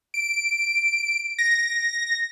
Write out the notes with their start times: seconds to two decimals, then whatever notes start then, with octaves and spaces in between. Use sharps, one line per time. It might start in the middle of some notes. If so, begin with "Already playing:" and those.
0.14 D7
1.38 A#6